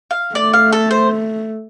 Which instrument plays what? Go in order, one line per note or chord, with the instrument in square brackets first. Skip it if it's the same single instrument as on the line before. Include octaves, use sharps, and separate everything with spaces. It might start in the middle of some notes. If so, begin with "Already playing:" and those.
[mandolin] F5
[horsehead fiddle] A3 [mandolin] D5
[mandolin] F5
A4
C5